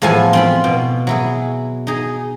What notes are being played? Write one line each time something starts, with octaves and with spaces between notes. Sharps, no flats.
E2 A2 F3 A4 E5 G#5
C4 F4 B5
B2
F#3 E4 G#4
D#4 G#4